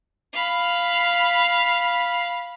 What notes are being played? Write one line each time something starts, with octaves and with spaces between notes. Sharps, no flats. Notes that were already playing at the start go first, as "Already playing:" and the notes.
F5 B5